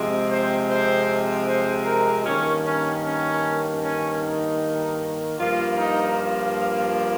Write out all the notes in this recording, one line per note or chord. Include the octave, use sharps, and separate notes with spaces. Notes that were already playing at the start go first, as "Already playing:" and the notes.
Already playing: C3 F3 G#3 C4
C5
C5
C5
A#4
G2 D#3 A#3 C#4
C#4
C#4
C#4
D#4
G2 F3 A#3 F4
D#4
F4